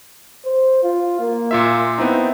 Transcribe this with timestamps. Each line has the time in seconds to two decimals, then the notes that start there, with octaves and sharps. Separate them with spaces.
0.45 C5
0.83 F4
1.20 A#3
1.51 A#2 F4 E5
1.98 B3 C4 D#4 E4